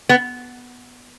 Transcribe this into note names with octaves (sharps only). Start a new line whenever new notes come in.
B3